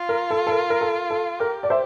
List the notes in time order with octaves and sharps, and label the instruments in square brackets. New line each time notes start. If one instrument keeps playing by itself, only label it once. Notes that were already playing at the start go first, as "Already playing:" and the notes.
Already playing: [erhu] F4
[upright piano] A#4
A4
A4
A#4
A#4
A4
A4
[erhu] G4 [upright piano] A#4
[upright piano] D5
C5 E5